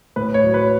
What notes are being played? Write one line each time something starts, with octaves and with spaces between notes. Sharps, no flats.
A2 B4
C#5
F#3
B4